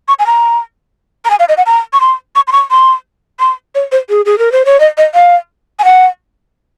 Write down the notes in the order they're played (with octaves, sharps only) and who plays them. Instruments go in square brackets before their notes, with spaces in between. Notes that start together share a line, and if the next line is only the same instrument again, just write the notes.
[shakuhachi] C#6
G#5
A#5
A#5
G#5
F5
D#5
F#5
A#5
C#6
C6
C#6
C6
C#6
C6
C6
C#5
C5
G#4
G#4
A#4
C5
C#5
D#5
D#5
F5
G#5
F#5